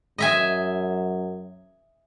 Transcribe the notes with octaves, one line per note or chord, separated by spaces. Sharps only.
F#2 D#5 E5 G#5